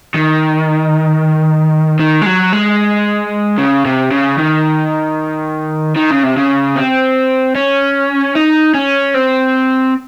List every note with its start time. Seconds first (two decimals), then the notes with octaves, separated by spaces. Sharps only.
0.14 D#3
2.00 D#3
2.22 G#3
2.26 F#3
2.53 G#3
3.58 C#3
3.85 C3
4.11 C#3
4.38 D#3
5.96 D#3
6.11 C#3
6.23 C3
6.37 C#3
6.76 C4
7.55 C#4
8.35 D#4
8.74 C#4
9.14 C4